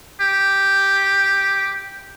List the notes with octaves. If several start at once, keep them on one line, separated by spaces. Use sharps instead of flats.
G4